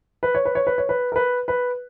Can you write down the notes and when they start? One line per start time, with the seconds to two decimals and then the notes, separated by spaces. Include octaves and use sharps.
0.23 B4
0.35 C#5
0.45 B4
0.55 C#5
0.67 B4
0.78 C#5
0.89 B4
1.12 A#4
1.16 B4
1.48 B4